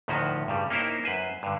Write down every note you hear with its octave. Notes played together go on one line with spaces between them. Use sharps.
D2 A2 D#3 F3 C#4 F#4
G2 C#3 G3
A#3 C#4 D#4 E4 A#4 C5
F#2 B4 C5 G#5
G2 D3